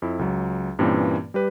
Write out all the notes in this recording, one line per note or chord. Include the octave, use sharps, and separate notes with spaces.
F2 E4
C#2 F#3
G2 A#2 E3 A#3 C4 C#4
G3 G4 B4